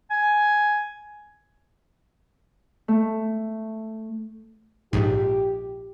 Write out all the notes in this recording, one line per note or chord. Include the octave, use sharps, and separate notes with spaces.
G#5
A3
A#1 G#2 G4